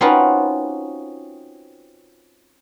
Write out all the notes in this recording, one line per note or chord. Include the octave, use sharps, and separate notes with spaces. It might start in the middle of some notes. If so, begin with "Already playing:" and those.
C4 C#4 D#4 F4 F#4 B4